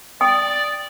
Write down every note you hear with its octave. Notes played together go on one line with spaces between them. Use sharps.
D5 G5 D#6